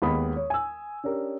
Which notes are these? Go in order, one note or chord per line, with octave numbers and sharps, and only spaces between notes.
D#2 G#3 B3 B5 D#6
C#5
G#5 E6
C#4 D4 G4 A#4